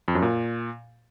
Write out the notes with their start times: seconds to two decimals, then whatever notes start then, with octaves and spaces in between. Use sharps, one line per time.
0.08 F2
0.15 F#2
0.22 A#2